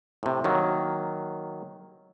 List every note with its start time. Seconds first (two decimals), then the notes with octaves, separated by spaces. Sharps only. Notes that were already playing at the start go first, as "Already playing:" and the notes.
0.23 A2 C3
0.44 D#3 F#3 A#3